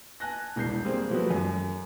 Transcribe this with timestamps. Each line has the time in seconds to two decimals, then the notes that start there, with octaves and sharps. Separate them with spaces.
0.20 G#5 A5 F#6 A#6
0.56 E1 C2 G6 C7
0.85 G3 A#3 C4 G#4
1.11 F3 F#3 A3 F#4 G#4 B4
1.30 F#2